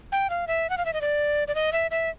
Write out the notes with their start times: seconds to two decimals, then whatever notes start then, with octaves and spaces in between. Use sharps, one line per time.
0.12 G5
0.30 F5
0.47 E5
0.70 F#5
0.78 F5
0.86 E5
0.93 D#5
1.01 D5
1.48 D5
1.55 D#5
1.72 E5
1.91 E5